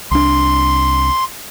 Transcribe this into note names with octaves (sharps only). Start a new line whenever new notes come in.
C2 D4 C6